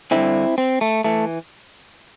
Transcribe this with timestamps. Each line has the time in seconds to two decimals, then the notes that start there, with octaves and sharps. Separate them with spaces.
0.11 G2 D3 C4 E4
0.58 C4
0.81 A3
1.04 E3 A3